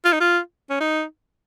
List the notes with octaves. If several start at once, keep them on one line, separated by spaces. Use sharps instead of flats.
F4
D#4
F4
C#4
D#4